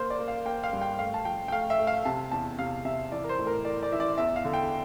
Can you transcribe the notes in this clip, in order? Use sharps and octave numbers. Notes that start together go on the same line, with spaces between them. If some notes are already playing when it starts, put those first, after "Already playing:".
Already playing: A#3 C5
D5
A#3
F5
A#3 G5
F5
G2
G5
A3 F5
A5
F3 G5
G5
A3 F5
E5
A3
F5
C3 A5
E2 A5
C3 F5
C3 E5
E3 D5
A#4
C5
A2
A#4
A2 D5
D5
E3 E5
D5
E2 E5
F5
D3
G5